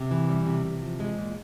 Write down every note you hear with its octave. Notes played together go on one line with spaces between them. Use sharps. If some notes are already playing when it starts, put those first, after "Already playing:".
Already playing: C3
E3
G3
C3
C3
F3
G#3
A#2